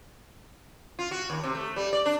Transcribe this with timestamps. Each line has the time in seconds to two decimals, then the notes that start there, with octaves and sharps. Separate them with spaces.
0.99 F4
1.11 F#4
1.30 D#2
1.44 C3
1.55 A3
1.76 G3
1.93 D5
2.06 D4